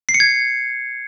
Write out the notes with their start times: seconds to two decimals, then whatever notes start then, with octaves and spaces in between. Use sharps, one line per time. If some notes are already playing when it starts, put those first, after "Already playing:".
0.09 C7
0.14 C#7
0.20 G#6